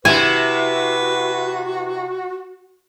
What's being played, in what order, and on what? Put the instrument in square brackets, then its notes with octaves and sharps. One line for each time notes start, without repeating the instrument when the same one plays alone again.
[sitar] C3 E4 [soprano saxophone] F#4 [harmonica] B4 [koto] G#5